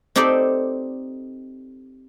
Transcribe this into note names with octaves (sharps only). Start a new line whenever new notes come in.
C4 D#4 G4 A4 D5